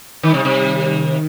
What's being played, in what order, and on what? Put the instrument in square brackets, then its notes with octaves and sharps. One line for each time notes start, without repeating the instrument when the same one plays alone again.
[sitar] D#3 [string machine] G3
[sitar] C3
C3
[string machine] D#3
D#3